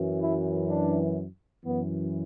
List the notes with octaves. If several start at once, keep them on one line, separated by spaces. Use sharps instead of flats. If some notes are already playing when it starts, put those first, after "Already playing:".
Already playing: F#2 E3
E4
D4
F#2 E3 B3